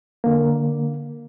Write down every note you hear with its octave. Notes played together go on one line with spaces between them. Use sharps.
D3 A#3